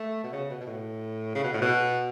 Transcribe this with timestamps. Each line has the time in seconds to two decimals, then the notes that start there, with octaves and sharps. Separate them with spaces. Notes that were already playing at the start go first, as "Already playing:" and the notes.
Already playing: A3
0.24 B2
0.33 C#3
0.50 B2
0.61 B2
0.67 A2
1.35 C#3
1.44 B2
1.54 A2
1.62 B2